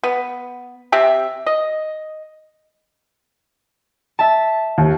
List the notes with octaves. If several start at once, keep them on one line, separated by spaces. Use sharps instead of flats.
B3
C3 C4 G4 E5
D#5
E5 A5
D#2